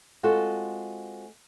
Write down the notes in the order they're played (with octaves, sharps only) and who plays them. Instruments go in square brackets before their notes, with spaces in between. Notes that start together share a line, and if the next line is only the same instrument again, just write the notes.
[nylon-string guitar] G#3 C4 F4 F#4 A4